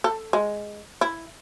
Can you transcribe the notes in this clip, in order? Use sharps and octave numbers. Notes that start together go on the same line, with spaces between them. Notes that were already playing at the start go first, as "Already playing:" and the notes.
A4
G#3
E4